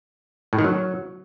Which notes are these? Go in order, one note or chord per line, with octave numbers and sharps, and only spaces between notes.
A2
D#3
F#3